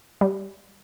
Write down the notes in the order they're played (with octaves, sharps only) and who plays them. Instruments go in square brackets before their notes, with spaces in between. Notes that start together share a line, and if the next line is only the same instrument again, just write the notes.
[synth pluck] G3